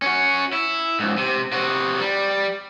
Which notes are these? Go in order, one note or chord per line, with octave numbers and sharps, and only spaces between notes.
C#4 F#4
E4
C#2 G#2
C3
C3 F#4
G3